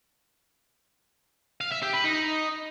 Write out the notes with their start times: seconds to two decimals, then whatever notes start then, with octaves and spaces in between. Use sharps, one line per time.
1.61 F5
1.72 E5
1.82 G4
1.93 B4
2.04 D#4